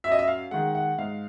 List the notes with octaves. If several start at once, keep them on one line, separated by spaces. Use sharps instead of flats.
F#2 E5
D#5
E5
F5
D#3 G#3 F#5
F#5
G#2 F5